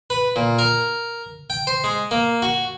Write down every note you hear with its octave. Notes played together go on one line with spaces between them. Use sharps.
B4
A#2
A#4
G5
C5
G#3
A#3
F#4